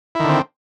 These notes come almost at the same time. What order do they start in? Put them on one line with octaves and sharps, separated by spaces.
E4 D#3 D3 C4